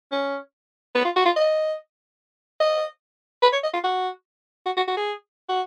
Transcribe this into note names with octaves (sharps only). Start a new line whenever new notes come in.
C#4
B3
F4
F#4
F4
D#5
D#5
B4
C#5
D#5
F4
F#4
F#4
F#4
F#4
G#4
F#4